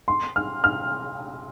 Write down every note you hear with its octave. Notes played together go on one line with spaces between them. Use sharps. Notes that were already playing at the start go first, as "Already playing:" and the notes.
C6
F6
F6